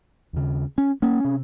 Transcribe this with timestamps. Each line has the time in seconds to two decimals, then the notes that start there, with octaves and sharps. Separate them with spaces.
0.33 D#2 C#3
0.78 C#4
1.02 A#3 C#4
1.25 C3